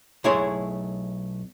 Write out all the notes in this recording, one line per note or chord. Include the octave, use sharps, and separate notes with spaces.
B1 A3 E4 G#4 C#5 C6